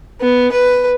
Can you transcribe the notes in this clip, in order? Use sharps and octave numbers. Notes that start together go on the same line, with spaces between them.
B3
B4